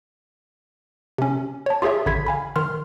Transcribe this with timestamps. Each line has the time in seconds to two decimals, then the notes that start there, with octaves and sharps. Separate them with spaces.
1.18 C3 C#4
1.66 C#5 A5
1.82 F4 G4 G#4 C#5 E5
2.06 A1 D3 B5 G#6 B6
2.26 F5 G#5 B5
2.56 D#3 C6 F6